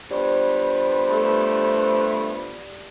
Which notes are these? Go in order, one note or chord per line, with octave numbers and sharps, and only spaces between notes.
G2 F3 B3 G4 C5 D5
A3